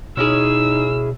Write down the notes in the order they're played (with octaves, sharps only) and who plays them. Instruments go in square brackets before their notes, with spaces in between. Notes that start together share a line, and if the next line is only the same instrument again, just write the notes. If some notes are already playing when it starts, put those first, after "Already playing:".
[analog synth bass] B2 [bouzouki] C#4 E4 G#4 [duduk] D#4 [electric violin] E6